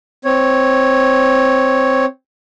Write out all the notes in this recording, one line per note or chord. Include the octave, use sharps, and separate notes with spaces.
C4 C#5